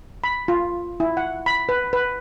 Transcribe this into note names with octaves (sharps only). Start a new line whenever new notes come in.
B5
F4
E4
F#5
B5
B4
B4